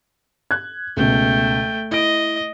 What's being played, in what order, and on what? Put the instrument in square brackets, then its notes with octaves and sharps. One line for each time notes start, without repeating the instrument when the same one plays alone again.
[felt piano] F#6 G#6
[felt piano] C#2 B2 [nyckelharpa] A3 G5
[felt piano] E4 D7 [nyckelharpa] D#5